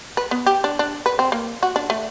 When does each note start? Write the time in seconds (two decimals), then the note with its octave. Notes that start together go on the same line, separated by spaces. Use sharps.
0.17 B4
0.31 B3
0.46 G4
0.64 D4
0.79 D4
1.06 B4
1.19 C4
1.32 A#3
1.63 F#4
1.76 D4
1.90 A3